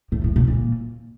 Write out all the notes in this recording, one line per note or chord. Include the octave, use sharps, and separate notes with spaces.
A2
A2
B2
A#2